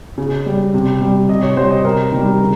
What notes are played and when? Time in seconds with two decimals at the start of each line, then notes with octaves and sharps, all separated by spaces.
0.18 C#3
0.46 G3
0.74 C3
1.01 G3
1.29 C3 D#5
1.43 C#5
1.57 G3 C5
1.71 D#5
1.84 C3 A#4
2.12 D#3 G3
2.40 C#3